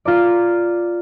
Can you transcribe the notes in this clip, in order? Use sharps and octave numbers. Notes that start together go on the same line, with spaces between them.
F4 A#4 D5